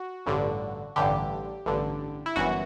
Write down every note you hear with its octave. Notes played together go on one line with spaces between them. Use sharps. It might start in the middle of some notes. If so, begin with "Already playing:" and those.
Already playing: F#4
A1 G2 D3
A1 G2 D3 G4
A1 G2 D3
E4
G1 F#2 E3 F#4